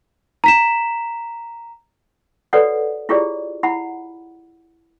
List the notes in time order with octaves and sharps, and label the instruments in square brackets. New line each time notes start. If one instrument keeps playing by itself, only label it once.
[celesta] A#5 B6 E7
[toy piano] F#4 A4 B4 C#5 D5 F#5
E4 F4 G4 G#4 C#5 D5
E4 F#5 B5